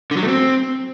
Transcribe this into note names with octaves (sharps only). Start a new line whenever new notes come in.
D3
F#3
A3
C4